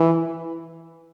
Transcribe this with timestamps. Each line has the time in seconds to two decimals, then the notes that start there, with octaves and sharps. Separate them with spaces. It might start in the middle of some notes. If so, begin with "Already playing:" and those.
Already playing: E3